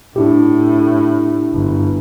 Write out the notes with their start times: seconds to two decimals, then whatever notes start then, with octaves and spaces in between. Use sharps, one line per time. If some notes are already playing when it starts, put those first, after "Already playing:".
0.16 A2 D4 E4 G4
1.53 G1